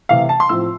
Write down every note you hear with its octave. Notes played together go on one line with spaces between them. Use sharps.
C3 E3 A3 F5
A5
C6
A2 F3 C4 E6